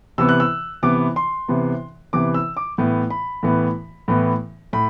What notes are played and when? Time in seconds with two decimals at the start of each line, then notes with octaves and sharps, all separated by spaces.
0.18 C3 E3 B3 E6
0.29 F#6
0.40 E6
0.83 C3 E3 B3 D6
1.16 C6
1.48 C3 E3 B3
2.13 C3 E3 B3 D6
2.34 E6
2.57 D6
2.78 A2 E3 B3
3.10 B5
3.43 A2 E3 B3
4.08 A2 E3 B3
4.73 A2 B5